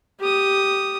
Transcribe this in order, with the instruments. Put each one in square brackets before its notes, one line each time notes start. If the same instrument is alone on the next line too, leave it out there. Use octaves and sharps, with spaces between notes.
[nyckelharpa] G4 D#6